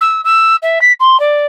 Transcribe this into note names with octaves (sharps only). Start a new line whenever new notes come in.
E6
E6
E5
B6
C6
D5